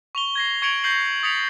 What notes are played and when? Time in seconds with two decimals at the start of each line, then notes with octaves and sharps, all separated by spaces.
0.15 C#6 F7 G7
0.36 G#6 A#6 C7
0.62 C#6 G#6 C#7 D7 F7 F#7
0.84 C#6 G6 A#6 C7 F#7
1.23 D#6 A6 B6 C#7 F7